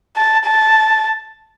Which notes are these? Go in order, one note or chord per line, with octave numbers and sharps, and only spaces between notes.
A5
A5